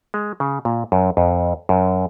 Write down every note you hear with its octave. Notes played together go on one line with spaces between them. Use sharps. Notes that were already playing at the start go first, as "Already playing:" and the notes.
G#3
C#3
A#2
F#2
F2
F#2